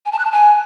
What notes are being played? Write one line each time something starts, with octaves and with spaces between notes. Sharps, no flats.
G#5
A5
F#6
A5
G#5